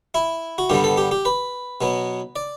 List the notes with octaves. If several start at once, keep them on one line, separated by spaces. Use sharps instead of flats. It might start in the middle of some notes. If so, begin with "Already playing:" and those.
E4
F#4
G2 D3 G3 B3 G4
A4
G4
G4
B4
B2 F#3 B3
D5